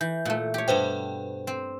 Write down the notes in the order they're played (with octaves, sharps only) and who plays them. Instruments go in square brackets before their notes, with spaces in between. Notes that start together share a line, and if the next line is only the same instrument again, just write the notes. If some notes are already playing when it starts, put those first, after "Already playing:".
[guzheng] E3 [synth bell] G6
[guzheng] A#2 A3
G4 C#5
[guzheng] G2 B2 [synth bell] B4 C5 G5
[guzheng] C4